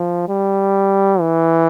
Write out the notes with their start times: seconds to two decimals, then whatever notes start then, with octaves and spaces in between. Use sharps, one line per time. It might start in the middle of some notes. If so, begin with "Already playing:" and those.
Already playing: F3
0.28 G3
1.20 E3